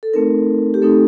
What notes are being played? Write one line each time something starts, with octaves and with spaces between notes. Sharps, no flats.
A4
A3 C4 D#4 A#4
G4
A3 C4 D#4 A4